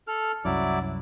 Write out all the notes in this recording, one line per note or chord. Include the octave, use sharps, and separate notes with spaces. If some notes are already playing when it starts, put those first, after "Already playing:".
A4 F6
C2 F#2 F#3 E4 D5